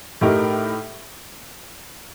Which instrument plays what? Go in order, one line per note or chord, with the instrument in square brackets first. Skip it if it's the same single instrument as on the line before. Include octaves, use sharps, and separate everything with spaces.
[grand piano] A2 A3 D#4 G4 A#4